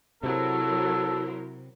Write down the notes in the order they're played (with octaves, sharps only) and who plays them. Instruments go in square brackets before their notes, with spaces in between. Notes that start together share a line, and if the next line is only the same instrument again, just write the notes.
[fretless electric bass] C3 [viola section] F#3 [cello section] E4 A#4 C5 [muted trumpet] A4